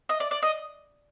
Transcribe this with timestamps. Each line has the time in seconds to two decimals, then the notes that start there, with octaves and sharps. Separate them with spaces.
0.09 D#5
0.20 D5
0.31 D5
0.43 D#5